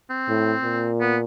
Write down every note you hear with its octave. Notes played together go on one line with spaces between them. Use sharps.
C4
A2
A#2
B3